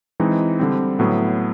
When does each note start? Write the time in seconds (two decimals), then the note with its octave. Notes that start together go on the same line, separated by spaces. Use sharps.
0.20 E3 G#3 C4 D#4
0.59 D3 G3 C4
0.99 A2 F#3 B3